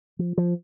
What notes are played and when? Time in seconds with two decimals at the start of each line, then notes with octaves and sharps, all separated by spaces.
0.19 F3
0.38 F3